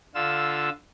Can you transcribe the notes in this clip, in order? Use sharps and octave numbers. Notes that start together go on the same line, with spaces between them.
D3 F4 E6